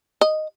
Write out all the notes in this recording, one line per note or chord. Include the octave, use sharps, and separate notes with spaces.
D#5